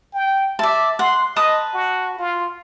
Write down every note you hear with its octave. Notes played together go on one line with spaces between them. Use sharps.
G5
D5 E5 A5
F#5 C6
B4 D#5 A5 D#6
F#4
F4